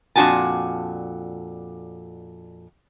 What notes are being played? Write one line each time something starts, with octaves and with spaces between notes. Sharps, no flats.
F2 A#2 D4 F#4 G#5 A5